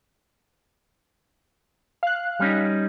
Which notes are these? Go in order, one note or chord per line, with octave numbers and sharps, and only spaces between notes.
F5 F#6
G3 C#4 D#4